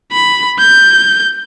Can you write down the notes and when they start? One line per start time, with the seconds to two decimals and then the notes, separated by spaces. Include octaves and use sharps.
0.12 B5
0.59 G6